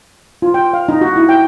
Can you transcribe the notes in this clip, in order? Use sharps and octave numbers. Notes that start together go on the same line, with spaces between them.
F4
G5
F5
D#4
F#4
E4
G5